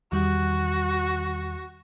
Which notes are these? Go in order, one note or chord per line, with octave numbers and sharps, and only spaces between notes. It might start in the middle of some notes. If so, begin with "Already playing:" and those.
E2 D#3 G3 F#4